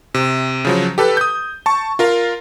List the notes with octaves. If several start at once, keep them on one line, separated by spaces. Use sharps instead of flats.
C3
C#3 F3 F#3
G4 A4 B4
D#6 G6
A5 C#6
F4 A#4 F5